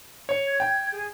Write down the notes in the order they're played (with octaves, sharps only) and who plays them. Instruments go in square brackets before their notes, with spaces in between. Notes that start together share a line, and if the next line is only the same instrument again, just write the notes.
[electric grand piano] C#5
[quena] G#6
[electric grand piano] G5
[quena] G#4